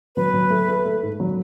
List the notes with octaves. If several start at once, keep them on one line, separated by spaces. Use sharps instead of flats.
F#3 B4
F#3
A3
A3
A3
G#2
F#3